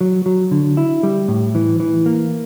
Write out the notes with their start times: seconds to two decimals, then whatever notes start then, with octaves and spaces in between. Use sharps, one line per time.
0.01 F#3
0.26 F#3
0.51 D3
0.77 E4
1.03 G3
1.28 A2
1.55 E3
1.80 E3
2.06 A#3